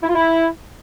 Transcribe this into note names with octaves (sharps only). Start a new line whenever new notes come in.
E4
F4
E4